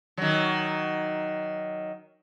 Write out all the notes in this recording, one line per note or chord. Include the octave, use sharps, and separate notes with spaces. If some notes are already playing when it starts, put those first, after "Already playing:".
D#3 F#3